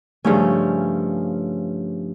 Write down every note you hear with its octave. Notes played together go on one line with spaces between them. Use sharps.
G2 C#3 F3 A3 C#4